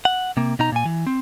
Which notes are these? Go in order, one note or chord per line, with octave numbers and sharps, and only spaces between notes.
F#5
C3 A#3
B2 D#4 A#5
A#2 G#5
E3
C4